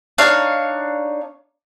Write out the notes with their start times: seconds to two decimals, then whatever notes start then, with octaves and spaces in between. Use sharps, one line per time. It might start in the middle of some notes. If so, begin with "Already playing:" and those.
0.18 D4 D#4 C#5 F5